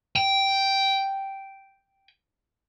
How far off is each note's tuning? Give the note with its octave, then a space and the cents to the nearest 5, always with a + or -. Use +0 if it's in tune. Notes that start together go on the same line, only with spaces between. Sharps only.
G5 -5